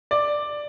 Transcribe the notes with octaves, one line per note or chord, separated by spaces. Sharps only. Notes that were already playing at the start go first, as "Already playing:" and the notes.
D5